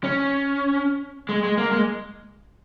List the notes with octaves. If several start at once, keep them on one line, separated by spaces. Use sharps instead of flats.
C#4
G#3
G#3
A#3
G#3